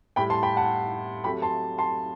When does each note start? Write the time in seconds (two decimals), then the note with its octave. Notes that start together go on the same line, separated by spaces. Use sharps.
0.16 A2 G3 G5 B5
0.30 A5 C6
0.43 G5 B5
0.57 F#5 A5
1.24 C3 F#3 A3 G5 B5
1.42 A5 C6
1.78 A5 C6